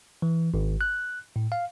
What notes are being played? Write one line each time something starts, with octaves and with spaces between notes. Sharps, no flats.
E3
G#1
F#6
A2
F5